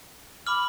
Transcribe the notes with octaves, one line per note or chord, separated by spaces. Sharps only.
B5 D6 F6 F#7